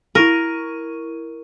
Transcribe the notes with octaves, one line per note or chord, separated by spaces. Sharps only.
E4 A#4 C#6 D#7